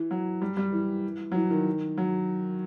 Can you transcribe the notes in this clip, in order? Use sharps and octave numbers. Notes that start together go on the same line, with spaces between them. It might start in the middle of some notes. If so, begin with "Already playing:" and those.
Already playing: E3
F#3
G3
G3
E3
F#3
E3
D#3
F#3